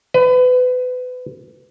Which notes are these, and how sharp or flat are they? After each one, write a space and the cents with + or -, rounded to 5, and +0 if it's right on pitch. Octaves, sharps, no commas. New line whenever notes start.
B4 +30